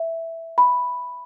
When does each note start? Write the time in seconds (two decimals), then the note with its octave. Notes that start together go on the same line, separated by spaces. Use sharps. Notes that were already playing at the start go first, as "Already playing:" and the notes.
Already playing: E5
0.58 B5